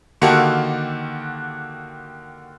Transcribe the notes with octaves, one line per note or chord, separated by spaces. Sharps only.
D3 D#3 A#3 F#4 G4 A4